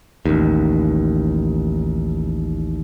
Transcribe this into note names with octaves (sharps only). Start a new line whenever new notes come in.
A1 D#2